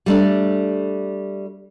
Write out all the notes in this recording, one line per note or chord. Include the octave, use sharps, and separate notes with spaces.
G3 A3 D4